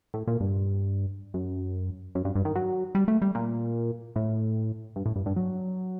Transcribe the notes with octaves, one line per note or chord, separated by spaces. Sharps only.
A2
A#2
G2
F#2
F#2
G2
G2
D#3
F#3
G3
A3
G3
A#2
A2
G2
A2
G2
G2
F#3